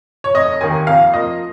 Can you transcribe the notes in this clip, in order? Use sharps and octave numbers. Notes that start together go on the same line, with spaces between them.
C#5
F1 D#5
D#2 D#3 A#3 G#5
F2 F5
F3 A#3 D#5